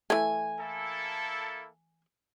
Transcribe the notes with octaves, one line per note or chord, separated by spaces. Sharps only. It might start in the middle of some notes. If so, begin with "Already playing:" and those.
E3 A3 G#5
A#3 E4 A4